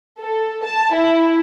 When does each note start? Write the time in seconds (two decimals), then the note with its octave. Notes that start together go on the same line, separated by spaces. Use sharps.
0.20 A4
0.65 A5
0.95 E4